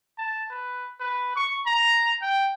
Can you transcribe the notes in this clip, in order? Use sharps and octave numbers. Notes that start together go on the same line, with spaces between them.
A5
B4
B4
C#6
A#5
G5